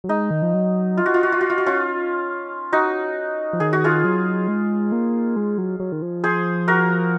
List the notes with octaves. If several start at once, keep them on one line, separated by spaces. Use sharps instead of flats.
F#3
G#3 D#4
D#3
F3
F#3
F4
F#4
F4
F#4
F4
F#4
F4
F#4
C#4 F4
D#4 F#4
F3
D#3 G#4
F#4
F4 G#4
F#3
G#3
A#3
G#3
F#3
F#3
D#3
F3
G#4 C5
F#4 A#4